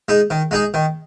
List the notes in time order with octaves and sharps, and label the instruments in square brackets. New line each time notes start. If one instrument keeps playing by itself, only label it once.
[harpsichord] G#3 D#4
D#3
G#3 D#4 G#4
D#3